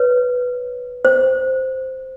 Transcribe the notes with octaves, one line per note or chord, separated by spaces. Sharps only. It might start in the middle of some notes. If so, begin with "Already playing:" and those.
Already playing: B4 C#5
C5